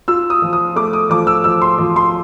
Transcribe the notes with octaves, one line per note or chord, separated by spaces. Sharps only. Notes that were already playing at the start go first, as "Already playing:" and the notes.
F4 E6
D#6
F3
D#6
A3 D6
D#6
F3 D6
E6
F3 E6
C6
F3
C6